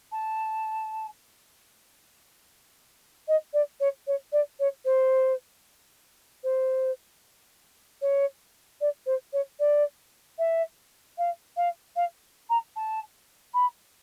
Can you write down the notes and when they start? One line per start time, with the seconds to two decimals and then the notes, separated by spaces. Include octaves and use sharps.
0.12 A5
3.28 D#5
3.53 D5
3.80 C#5
4.07 C#5
4.32 D5
4.59 C#5
4.85 C5
6.43 C5
8.01 C#5
8.80 D5
9.06 C5
9.33 C#5
9.59 D5
10.38 E5
11.18 F5
11.56 F5
11.96 F5
12.49 A#5
12.76 A5
13.54 B5